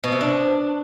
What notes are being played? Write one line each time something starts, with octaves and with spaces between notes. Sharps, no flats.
B2
C3
D4